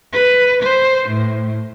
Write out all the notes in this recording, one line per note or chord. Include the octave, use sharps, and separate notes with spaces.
B4
C5
A2